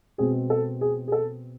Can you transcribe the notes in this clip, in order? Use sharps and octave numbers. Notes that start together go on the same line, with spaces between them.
B2 G#3 C4 G#4
A4
G#4
G#4
A4